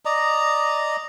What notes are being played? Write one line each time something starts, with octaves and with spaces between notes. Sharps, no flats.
D5 D#5 A#5